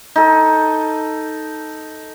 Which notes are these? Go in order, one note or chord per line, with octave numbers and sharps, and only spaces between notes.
D#4 A4